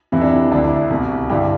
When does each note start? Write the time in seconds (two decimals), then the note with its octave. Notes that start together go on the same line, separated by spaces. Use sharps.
0.12 F2 C3 E3 E4
0.22 D4
0.31 E4
0.52 D2 D3 D4
0.64 E4
0.90 C2 B2
1.30 G2 D3 E4 G4